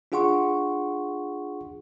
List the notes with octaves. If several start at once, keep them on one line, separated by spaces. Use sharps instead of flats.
D4 F4 G#4 F#5 C6 C#6